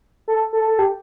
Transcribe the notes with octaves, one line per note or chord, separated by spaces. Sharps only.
A4
A4
A4
G4